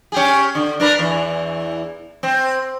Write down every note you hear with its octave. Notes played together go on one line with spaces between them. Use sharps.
C#4 G4 G#4
D3
D4 A#4 B4
E2 E3
C4